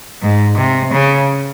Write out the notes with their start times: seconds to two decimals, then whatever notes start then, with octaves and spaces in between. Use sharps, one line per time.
0.22 G#2
0.57 C3
0.93 C#3